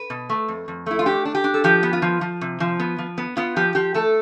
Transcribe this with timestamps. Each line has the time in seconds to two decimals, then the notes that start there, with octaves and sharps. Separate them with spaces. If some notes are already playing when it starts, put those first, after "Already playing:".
Already playing: B4
0.10 B2
0.30 A3
0.48 F2
0.68 F2
0.86 A3 E4
0.99 F4
1.06 D4 G4
1.25 D4
1.35 G4
1.44 D4
1.54 A4
1.64 F3 G4
1.83 B3
1.93 F4
2.02 F3
2.21 F3
2.41 C3
2.60 F3
2.80 B3
2.98 F3
3.18 B3
3.37 B3 F4
3.56 F3 G4
3.75 F3 G4
3.94 A3 A4